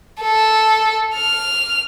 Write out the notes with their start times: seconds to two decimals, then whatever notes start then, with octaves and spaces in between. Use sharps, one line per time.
0.21 A4
1.16 F6